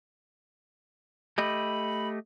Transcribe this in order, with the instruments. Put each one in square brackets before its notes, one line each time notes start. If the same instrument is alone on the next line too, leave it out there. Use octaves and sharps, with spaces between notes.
[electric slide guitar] A3 G4 D#5 [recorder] B5